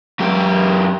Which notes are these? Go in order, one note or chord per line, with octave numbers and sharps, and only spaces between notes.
F#2 G4